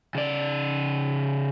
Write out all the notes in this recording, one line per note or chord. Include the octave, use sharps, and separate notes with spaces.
C#3 D5